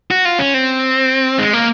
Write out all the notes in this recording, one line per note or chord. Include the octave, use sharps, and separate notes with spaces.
F#4
F4
C#4
C4
G#3
A#3